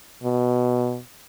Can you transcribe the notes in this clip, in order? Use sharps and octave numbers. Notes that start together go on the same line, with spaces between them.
B2